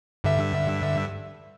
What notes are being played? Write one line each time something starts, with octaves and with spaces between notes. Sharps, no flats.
G2 D3 E5